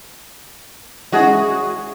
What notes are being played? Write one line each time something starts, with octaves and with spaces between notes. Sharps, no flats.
G#3 C#4 E4 F#4 G#4